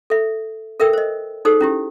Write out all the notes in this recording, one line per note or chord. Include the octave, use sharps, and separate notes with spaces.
A4 E5
A4 A#4 E5 G5 E6
C5 D#5
D#4 G#4 A4 C5 D#6
C#4 E4 G4